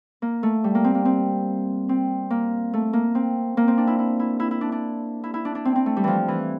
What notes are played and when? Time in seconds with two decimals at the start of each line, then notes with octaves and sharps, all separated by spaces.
0.22 A#3
0.43 A3
0.64 G3
0.75 A#3
0.84 C4
0.95 A#3
1.05 C4
1.89 C4
2.30 A#3
2.73 A3
2.93 A#3
3.15 C4
3.57 A#3
3.68 C4
3.78 D4
3.87 E4
3.99 E4
4.19 E4
4.40 E4
4.51 E4
4.61 D4
4.72 D4
5.24 E4
5.34 E4
5.45 D4
5.55 D4
5.65 C4
5.76 C4
5.86 A3
5.97 G3
6.04 E3 F3
6.28 E3